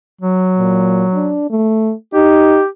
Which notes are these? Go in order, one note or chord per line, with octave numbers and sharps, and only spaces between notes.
F#3
A#2
D4
A3
D#4 G4